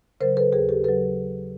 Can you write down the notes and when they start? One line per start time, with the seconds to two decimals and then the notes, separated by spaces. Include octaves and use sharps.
0.20 C#3 F#3 A#4 C5
0.37 A4 B4
0.52 D#2 G#4 A#4
0.69 G4 A4
0.84 C#3 F#3 A4 B4